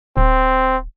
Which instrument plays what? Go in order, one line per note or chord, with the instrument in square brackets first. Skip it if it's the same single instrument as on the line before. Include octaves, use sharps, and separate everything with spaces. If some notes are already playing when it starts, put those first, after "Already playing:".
[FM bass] D1 [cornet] C4